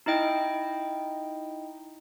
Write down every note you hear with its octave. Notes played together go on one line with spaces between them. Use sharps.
D#4 E4 D#5 G5